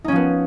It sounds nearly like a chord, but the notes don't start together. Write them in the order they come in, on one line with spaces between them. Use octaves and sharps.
D#4 C#4 F3 B3